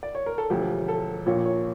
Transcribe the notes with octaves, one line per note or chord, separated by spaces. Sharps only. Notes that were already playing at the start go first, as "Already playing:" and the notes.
D5
C#5
A#4
A4
E1 D2 D3 F3 G4
A4
A#1 A#2 F3 C#5
C#5